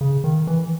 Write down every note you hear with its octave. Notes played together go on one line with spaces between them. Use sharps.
C#3
D#3
E3